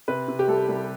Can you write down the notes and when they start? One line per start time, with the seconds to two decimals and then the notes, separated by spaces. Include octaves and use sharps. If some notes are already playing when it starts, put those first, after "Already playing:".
0.08 C3 B4
0.28 C3
0.39 G4
0.48 C2 A4
0.68 C2